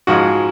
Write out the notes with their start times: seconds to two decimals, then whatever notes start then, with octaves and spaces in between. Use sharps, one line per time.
0.07 G#2 F3 G#3 F#4